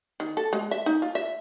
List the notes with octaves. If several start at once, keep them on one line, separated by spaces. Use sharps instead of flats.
D#3
A4
G#3
E5
D#4
F4
E5